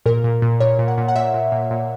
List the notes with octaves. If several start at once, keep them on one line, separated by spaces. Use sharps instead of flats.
A#2 A#4
A#2
A#2
A#2 C#5
A#2
F#5
A#2
F#5
A#2 E5
A#2
A#2
A#2